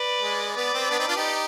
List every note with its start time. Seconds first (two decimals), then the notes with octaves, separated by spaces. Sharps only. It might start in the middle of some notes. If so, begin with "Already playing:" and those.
Already playing: B4 D5
0.21 G#3
0.55 B3 B4 D5
0.74 C4
0.91 B3 D4
0.99 C4 D#4
1.08 D4 F4
1.16 D#4 G4